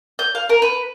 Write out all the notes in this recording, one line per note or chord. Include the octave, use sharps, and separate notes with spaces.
G6
F5
A#4
B4